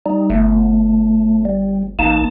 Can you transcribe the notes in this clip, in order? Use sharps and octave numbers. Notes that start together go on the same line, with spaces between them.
G3 D#4
G1 A3
G3
A1 A#3 D#4 A5